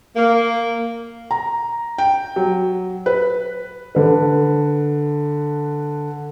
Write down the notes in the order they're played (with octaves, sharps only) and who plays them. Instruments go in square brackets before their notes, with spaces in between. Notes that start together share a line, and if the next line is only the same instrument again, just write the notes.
[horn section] A#3
[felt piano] A#5
G5
F#3
B4
[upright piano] D3 B4